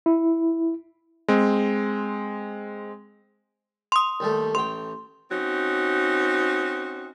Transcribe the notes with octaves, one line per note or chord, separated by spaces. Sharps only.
E4
G#3 C4
C6 D#6
D#2 G3 A3
A1 G5 C6
C4 C#4 D#4 F#4